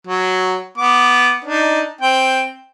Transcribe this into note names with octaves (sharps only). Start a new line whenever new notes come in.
F#3
B3 D6
D4 D#4
C4 G5